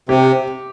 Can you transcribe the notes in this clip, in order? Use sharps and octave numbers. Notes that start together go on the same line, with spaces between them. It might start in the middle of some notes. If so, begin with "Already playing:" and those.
C3 G4